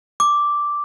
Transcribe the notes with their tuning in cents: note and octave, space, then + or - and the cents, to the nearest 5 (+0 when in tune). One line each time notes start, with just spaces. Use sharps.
D6 -5